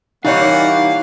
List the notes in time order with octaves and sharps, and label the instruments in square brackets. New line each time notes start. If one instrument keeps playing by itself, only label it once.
[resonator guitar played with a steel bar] E3 G3 C#5 [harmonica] A#3 F#5 [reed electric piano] D#4 [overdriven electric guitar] F5